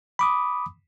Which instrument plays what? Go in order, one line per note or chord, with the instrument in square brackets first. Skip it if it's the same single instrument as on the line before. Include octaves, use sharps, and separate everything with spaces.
[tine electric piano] B5 D6 D#6